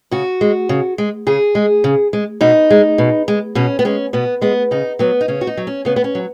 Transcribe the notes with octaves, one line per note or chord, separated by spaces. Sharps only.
C#3 F#4
G#3
C#3
G#3
C#3 G#4
G#3
C#3
G#3
B2 D#4
G#3
B2
G#3
B2 C#4
B3
G#3 C#4
B2 B3
G#3 B3
C#3 D#4
F#3 B3
D#4
C#3 C#4
F#4
D#4
F#3
C#4
C#3 B3
B3
C#4
F#3